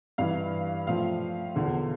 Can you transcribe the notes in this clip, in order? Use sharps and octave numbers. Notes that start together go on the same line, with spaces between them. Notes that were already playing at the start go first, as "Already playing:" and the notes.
G2 E3 F5
A2 F3 F5
E2 D3 F3